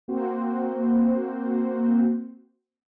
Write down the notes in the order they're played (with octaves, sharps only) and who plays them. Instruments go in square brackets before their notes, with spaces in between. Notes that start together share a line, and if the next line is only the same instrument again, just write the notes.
[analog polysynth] A#3 C4 F#4 C5